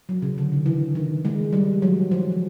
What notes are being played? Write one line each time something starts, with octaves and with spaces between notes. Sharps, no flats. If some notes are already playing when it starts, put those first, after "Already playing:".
F#3
C#3
D3
D#3
E3
D#3
G#3
G3
F#3
F3